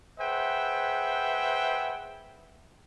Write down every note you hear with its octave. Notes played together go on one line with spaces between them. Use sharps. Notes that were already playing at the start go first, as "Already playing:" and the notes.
G#4 B4 C5 E5 F#5 G5